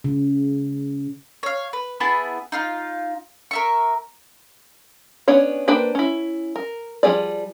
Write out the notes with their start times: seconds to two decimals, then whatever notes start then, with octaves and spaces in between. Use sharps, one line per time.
0.04 C#3
1.43 C#5 F5
1.73 B4
2.00 B3 E4 G#4 A5
2.52 D#4 F4 F5
3.51 A#4 E5 C#6
5.28 B3 C#4 D4 C#5
5.68 A#3 D4 B4 C5 G5
5.95 C#4 E4
6.56 A#4
7.03 F3 G3 C4 G#4 D5